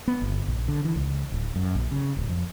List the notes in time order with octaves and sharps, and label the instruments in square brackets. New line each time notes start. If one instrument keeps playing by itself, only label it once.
[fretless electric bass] B3
G1
A#1
D3
E3
C#2
D1
F#2
A#1
C#3
D1
F2